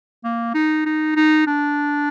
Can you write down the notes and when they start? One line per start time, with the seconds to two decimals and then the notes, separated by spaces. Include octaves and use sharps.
0.25 A#3
0.54 D#4
0.86 D#4
1.16 D#4
1.47 D4